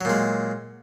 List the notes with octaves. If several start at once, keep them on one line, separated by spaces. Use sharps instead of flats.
A#2 F#3 G#3